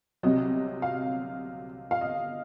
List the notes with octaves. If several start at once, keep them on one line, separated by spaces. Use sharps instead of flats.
C2 C3 F#3 D#5
F5
F5
D#5